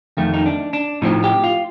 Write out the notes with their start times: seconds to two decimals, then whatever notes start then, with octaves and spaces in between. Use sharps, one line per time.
0.17 F2 D#3 A3
0.34 D#4
0.46 D4
0.73 D4
1.02 A2 F3 C4 D#4
1.24 G4
1.44 F4